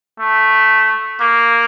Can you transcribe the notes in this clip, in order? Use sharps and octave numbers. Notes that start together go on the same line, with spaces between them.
A3
A#3